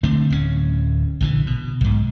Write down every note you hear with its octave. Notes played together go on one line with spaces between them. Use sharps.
D3 A3 C4 D4
D1 G2 C#4
A#1 D3 E3
B2
B1 G#2